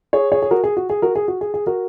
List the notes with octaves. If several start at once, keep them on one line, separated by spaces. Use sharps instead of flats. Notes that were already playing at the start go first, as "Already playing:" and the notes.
G#4 C#5
G#4 C#5
G#4
F#4 A#4
G#4
F#4
G#4
F#4 A#4
G#4
F#4
G#4
G#4
F#4 A#4